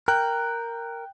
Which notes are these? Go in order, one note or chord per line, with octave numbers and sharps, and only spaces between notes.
A#4 G5 F#6